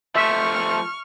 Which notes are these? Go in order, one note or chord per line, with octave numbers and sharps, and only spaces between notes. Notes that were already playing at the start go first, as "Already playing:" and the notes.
F3 A3 E5 C#6 F6